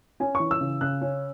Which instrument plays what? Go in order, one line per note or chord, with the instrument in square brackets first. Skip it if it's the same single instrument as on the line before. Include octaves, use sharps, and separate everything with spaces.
[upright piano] C#4 G#5
C#6
E3
E6
C#3
C#3 F#6
C#4